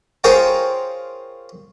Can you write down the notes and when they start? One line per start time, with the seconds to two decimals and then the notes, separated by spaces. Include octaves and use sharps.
0.24 F4 G#4 A#4 C5 C#5 G5